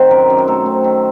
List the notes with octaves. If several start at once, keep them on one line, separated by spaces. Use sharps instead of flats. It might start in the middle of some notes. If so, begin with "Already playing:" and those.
Already playing: D#3 C4 C5 F#5
F#2 A#4
F#2
A#4
A3 A4
C4
D#3